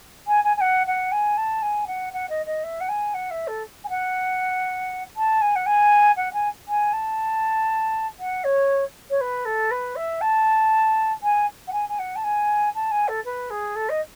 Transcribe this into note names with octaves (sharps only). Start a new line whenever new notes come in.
G#5
G#5
G#5
F#5
F#5
G#5
A5
G#5
F#5
F#5
D#5
D#5
E5
F#5
G#5
F#5
E5
A4
G#5
F#5
A5
G#5
F#5
G#5
F#5
G#5
G#5
A5
F#5
C#5
C#5
B4
A4
B4
E5
A5
G#5
F#5
G#5
G#5
F#5
A5
G#5
A5
G#5
A4
B4
G#4
A4
D#5